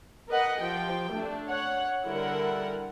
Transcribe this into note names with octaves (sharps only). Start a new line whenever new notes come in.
A#4 B4 D#5 F#5
F3 G4 G5
A3 D4
C#5 F#5
D3 G3 E4 A#4 F#5